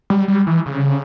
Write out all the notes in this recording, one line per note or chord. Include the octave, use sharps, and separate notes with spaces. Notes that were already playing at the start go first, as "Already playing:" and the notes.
G3
G3
E3
C#3